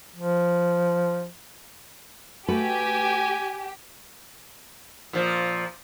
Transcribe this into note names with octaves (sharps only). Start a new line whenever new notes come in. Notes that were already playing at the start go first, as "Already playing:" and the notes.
F3
A3 F#4 G4 B4 G#5
A#2 F3